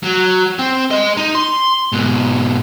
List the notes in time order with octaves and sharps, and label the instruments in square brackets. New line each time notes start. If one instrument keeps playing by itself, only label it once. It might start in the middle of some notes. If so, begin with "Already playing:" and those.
[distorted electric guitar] F#3
C4
G#3 D#5
D#4
C6
G#2 B2